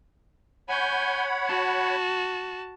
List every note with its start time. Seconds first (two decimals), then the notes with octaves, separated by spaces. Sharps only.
0.69 C#5 F#5 G#5 B5 G6
1.46 F#4 A5